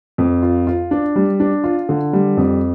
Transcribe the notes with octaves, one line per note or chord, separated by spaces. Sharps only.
F2
F4
F4
D4
G3
D4
F4
D3
G3
F2